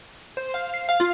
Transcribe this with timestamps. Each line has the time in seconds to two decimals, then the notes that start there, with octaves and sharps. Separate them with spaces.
0.37 C5
0.54 F5
0.74 C7
0.89 F5
1.00 F4